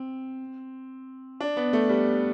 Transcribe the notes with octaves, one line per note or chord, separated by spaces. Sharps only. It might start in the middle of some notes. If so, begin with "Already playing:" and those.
Already playing: C4
D4
B3
A3
G3